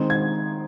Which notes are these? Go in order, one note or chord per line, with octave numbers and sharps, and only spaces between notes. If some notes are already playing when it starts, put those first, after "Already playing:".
Already playing: D#3 G#3 C4
G#6